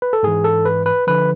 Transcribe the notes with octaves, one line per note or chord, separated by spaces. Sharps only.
B4
A4
G#2 E3 G#4
A4
B4
B4
D3 F3 B4